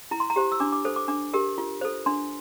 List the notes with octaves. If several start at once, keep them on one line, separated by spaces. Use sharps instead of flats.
E4 A#5
C6
A#5
G4 C5
E6
D4 D6
D6
A4 C5
D6
D4 D6
G4 A#4
F4
A4 C5
D4 C6